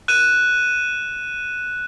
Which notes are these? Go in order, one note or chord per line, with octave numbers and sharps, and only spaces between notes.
F#6 D#7 E7